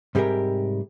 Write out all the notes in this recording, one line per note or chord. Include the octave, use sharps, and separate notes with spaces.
G#2 C3 G3 G4 G#4 A#4